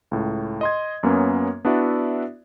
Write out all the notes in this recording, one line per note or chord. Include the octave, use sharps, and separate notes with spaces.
C#2 A2
D#5 C6 G#6
F#2 A#3 B3 C#4
B3 D4 E4 F#4 D5 E5